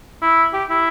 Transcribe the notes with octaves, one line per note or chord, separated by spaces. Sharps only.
E4
G4
E4